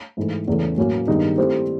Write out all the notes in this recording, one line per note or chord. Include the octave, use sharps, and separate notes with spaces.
G#2 E3 A3
E2 C#3 E3 A3 C#4
A2 F#3 A#3 C#4 F#4
G2 D#3 G#3 B3 D#4
A3 C4 E4 G4 C5